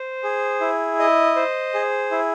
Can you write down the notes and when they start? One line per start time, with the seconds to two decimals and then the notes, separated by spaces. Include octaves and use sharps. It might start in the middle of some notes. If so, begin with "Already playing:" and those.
Already playing: C5
0.23 G#4
0.61 E4
0.99 D#5
1.36 C5
1.74 G#4
2.11 E4